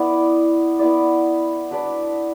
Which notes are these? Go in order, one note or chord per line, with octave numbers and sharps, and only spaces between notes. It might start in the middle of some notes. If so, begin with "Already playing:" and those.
Already playing: B3 E4 D5
B3 E4 D5
F#3 D4 B4 D5